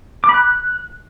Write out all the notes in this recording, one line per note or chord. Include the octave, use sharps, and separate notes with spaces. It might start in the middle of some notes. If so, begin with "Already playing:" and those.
D6
B5
F#6